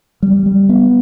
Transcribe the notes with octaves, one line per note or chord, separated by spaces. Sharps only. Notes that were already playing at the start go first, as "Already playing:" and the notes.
G3
G3
B3